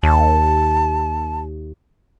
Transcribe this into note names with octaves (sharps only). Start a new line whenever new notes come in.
D#2 A5